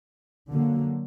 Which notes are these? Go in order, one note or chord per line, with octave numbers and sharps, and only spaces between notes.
D3 F#3 A#3